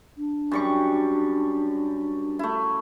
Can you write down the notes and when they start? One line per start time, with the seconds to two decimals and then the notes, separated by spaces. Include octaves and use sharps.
0.17 D4
0.51 F#2 G3 C#6
2.39 A3 E4